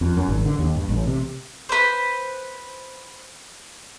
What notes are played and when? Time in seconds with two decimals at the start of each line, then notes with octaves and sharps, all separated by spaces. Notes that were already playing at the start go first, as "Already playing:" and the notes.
0.01 F2
0.17 F#2
0.28 G#1
0.46 D3
0.59 D#2
0.76 G2
0.89 A1
1.07 C3
1.69 B4 C5